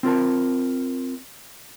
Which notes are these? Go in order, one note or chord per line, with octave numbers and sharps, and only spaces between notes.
C4 F4 A#4 A5